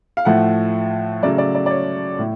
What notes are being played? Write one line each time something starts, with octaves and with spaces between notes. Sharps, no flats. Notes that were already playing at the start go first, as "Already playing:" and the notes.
F5
A2 F3 A3 F#5
C#3 F#3 A3 D5
D5
D5
D5
C#5
A2